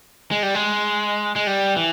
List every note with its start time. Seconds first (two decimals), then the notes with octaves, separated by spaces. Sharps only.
0.31 G#3
0.43 G3
0.55 G#3
1.36 G#3
1.47 G3
1.76 E3